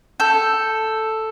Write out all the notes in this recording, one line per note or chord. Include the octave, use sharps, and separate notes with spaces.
A4 G6